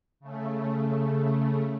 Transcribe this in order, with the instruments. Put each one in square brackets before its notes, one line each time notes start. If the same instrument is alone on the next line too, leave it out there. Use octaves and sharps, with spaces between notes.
[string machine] C#3 A3